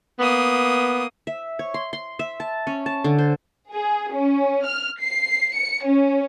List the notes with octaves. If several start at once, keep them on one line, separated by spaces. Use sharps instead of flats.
A#3 B3 D#6
E5
C#5
C6
C6
E5
A5
C#4
A5
D3
C5
G#4
C#4
F6
C7
C#7
C#4